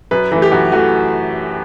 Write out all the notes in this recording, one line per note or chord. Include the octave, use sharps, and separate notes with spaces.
F#2 B4
E3 A3 B4
G4
F#2 F#4
E3 A3 F#4